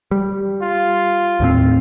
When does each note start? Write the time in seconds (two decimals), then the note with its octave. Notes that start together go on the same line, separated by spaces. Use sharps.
0.11 G3
0.62 F4
1.40 D#2 A2 C4